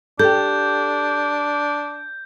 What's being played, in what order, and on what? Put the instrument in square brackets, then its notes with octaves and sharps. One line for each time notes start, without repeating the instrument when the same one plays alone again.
[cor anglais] D4 [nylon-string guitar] G4 A4 [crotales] G6